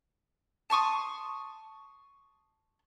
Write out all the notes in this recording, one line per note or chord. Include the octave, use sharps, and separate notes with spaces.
A5 C6 C#6 D#6